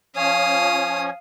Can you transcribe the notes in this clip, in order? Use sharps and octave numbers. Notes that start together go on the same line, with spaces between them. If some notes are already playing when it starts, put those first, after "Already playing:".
F3 C#4 C#5 F5 D#6